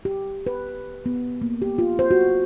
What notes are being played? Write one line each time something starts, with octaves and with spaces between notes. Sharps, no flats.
G4
B4
B3
A#3
G4
F4
C5
F#4